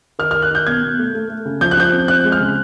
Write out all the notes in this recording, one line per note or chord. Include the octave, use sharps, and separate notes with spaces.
D#3 F6
F6
D#3
F#6
D#3 G6
B2 G#6
B2
A3
A3
A3
C#3
F3 G6
F#6
F3 G6
C4
F3 F#6
G#3
F6
C#3